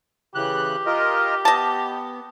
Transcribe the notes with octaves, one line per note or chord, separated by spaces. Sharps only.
C#3 E3 G4 F#6
F4 A#4 D#5
B3 D#5 A5